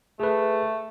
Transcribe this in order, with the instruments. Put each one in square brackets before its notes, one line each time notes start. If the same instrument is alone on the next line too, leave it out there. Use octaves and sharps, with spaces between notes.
[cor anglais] A3 [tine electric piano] G#4 B4